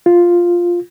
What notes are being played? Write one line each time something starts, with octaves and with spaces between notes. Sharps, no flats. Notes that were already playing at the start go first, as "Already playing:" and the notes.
F4